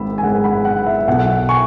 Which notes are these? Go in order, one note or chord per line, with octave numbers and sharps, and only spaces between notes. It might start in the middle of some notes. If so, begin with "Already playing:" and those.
Already playing: G#1 G#2 G#3 B5 E6
G#5
G#1 G#2 G#3 F#5
F#5 B5
F#5
E5
E5
B1 B2 F#3 F#5
G#5 C#6